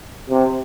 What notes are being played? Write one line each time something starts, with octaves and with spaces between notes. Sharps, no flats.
C3